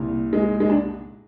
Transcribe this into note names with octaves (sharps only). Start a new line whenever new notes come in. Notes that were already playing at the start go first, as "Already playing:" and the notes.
Already playing: C2 A#2
G#3
G#3
D4